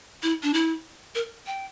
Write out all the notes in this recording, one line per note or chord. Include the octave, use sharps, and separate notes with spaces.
E4
D4
E4
A#4
G5